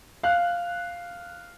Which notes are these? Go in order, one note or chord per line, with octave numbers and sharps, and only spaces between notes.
F5 F#6